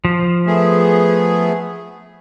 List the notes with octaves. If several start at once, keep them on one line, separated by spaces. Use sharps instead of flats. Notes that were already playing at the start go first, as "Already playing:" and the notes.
F3
A3 B3 G#4